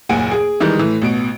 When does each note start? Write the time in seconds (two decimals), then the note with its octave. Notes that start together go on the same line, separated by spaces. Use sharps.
0.09 F#1 D#2 A#2 F#5 G#5 D7
0.31 G#4
0.60 D#3 E3 G3 G#3
0.79 A2 E3
1.02 A1 B2 D7